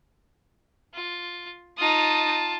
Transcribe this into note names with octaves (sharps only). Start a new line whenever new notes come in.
F4
D#4 F4 A5 D#6